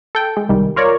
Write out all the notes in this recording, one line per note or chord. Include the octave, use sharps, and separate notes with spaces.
A4 G5
G#3
C2 D#3 G3
F4 A#4 C#5 D5